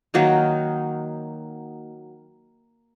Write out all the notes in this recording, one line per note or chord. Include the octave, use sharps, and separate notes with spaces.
D#3 F#3 A#3 D#4